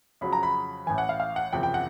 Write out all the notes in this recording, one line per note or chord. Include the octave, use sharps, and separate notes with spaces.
F2 C#3 F#3 B5
A#5
B5
A1 A2 E3 G#5
F#5
F5
F5
F#5
F#1 E2 C3 F3 G5
G5
F#5